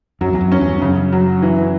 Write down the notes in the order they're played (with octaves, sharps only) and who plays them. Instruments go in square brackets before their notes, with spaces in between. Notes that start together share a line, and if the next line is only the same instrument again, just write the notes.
[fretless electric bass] F#2 [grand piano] F#3
[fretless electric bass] E2
F#2
[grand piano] C#4
[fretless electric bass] E2 G2
[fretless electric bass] F#2 [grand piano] C#3
[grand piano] F#3
E3